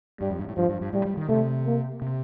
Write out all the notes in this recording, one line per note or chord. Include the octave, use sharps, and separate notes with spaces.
G2 G3
F2
G2
A2
G2 F3
G2
G2
A2 G3
G3
D#3
C3 A3
A#3
C3